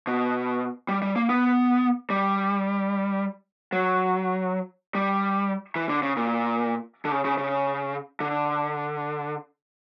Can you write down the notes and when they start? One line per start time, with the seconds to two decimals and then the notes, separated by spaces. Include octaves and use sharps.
0.07 B2
0.88 G3
1.02 G3
1.16 A#3
1.30 B3
2.10 G3
3.72 F#3
4.95 G3
5.76 E3
5.89 D3
6.03 C#3
6.17 A#2
7.05 D3
7.12 C#3
7.25 C#3
7.38 C#3
8.20 D3